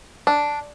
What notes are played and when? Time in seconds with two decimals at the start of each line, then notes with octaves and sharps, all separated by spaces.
0.27 D4